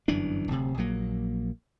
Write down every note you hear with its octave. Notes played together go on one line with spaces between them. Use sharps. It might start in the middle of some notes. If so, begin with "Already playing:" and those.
G1 F#2 E3 D4
D1 C3
A#1 F#3 A#3